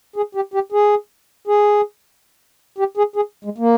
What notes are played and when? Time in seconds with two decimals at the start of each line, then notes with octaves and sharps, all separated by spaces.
0.16 G#4
0.35 G4
0.54 G4
0.72 G#4
1.47 G#4
2.78 G4
2.97 G#4
3.16 G#4
3.45 G#3
3.58 A#3